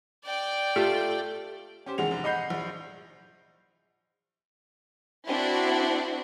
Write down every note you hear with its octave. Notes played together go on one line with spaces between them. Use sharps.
D5 G5
A3 F4 G4 A4
C#4 G4 C5
F1 D#3 G#3 F#5 F7
F1
D#5 F#5 B5 G6 C7
A#1
C4 D4 E4 F#4